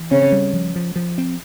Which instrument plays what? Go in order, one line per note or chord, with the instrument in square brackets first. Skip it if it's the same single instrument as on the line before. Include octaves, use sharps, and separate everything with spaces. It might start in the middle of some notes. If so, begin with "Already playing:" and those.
Already playing: [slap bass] E3
[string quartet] C#3 C#4 [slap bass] C4
[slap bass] G3
F3
F3
F3
C4